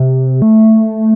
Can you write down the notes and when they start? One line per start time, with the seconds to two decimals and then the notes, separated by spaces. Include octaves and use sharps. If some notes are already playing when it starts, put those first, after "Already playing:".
Already playing: C3
0.42 A3